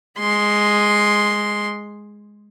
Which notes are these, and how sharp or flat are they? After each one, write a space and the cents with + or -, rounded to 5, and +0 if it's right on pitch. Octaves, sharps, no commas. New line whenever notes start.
G#3 +0 C6 +0